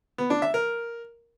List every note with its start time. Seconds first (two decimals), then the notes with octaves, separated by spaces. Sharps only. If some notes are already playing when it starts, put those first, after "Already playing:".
0.18 B3
0.30 D4
0.42 E5
0.54 A#4